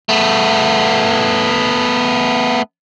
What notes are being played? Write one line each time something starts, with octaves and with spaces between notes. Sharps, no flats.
A3 B3